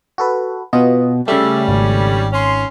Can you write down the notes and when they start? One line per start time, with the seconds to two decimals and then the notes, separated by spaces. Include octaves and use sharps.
0.18 F#4 A4 B4
0.73 B2 B3 F4 D#5
1.28 C#3 G3 A3 C#4 E5
1.68 G#1
2.33 C#4 C6